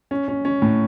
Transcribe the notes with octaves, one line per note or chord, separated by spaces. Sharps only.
C#4
C#4
C#4
A2